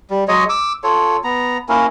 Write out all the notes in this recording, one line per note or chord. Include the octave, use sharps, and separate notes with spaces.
G3
F#3 G#3 C#5 D#5
D6 E6
F4 A4 C#5
B3 A#5
A#3 C#4 E4 A#4